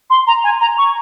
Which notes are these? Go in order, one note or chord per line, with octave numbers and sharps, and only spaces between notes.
C6
A#5
G#5
A#5
C#6